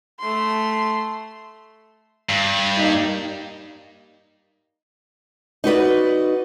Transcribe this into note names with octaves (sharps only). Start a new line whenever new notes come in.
A3 C6
G2
G3 A#3 D#4
D#4 F#4 B4 D5